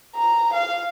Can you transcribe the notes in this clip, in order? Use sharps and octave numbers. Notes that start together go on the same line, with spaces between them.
A#5
F5